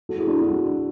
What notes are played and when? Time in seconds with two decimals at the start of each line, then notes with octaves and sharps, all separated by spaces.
0.09 F#4 A4
0.18 E4 G#4
0.27 D4 F#4
0.42 D4 F#4